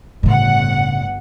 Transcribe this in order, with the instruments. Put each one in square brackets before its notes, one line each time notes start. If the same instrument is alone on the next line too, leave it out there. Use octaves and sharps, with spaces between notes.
[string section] G1 F#5 [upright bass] A2 C#3